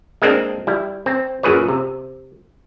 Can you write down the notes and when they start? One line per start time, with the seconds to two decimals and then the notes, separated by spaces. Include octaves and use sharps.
0.22 G#3 A#3 C4 D4
0.67 G3 E4
1.06 C4
1.43 F#2 A#2 G#4 B4 C#5
1.68 C3